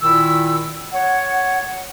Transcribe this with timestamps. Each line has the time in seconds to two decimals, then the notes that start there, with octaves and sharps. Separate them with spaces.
0.02 A#2 D#3 E4 E6
0.94 C#5 F#5